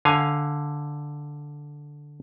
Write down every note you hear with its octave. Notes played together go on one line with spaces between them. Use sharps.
D3 F5 G#5